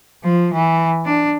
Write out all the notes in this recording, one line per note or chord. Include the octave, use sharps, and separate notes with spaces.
F3
E3
D4